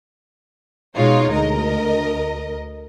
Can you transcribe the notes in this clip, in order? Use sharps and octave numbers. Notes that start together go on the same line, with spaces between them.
B2 G#3 D#4 F4 C#5
D2 A#4 D#5